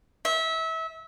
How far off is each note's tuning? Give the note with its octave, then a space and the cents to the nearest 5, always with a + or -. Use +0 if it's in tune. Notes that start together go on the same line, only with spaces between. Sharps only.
E5 -25